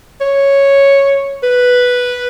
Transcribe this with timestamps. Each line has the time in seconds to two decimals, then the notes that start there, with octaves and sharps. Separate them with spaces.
0.21 C#5
1.43 B4